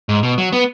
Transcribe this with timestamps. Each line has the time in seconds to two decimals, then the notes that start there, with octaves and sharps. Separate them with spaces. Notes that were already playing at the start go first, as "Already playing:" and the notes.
0.09 G#2
0.23 B2
0.38 F#3
0.53 B3